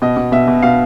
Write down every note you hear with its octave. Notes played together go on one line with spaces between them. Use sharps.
B2 D#5
B2
B2 E5
B2
B2 F5